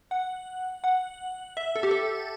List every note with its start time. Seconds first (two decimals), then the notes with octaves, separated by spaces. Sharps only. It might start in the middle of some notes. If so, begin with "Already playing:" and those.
0.11 F#5
0.84 F#5
1.57 E5
1.76 A4
1.83 G4
1.91 A4